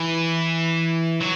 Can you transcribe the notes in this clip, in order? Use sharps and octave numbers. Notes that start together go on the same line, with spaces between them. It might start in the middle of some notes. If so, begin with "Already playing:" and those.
Already playing: E3
F#3